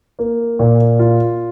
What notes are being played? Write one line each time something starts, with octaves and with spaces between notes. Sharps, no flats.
A#3
A#2
F4